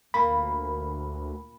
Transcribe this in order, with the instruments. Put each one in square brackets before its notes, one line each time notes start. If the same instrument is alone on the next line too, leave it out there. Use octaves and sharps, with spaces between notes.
[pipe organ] D2 [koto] A#2 A#3 [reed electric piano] B5